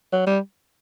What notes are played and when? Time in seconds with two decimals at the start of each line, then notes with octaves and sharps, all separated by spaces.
0.13 F#3
0.27 G3